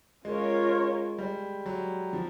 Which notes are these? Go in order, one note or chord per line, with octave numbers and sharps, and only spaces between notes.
G#3 C#4 F4 A#4 C#5
G3
F#3
F3